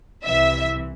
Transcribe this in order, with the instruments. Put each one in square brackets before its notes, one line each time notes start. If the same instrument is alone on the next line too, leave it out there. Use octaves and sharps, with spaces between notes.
[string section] C2 C3 E3 E5